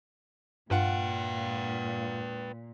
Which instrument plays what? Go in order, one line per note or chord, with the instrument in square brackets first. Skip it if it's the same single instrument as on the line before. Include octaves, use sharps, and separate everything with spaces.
[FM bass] G2 [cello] A#2 [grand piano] F4 F#5 [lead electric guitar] B4 G5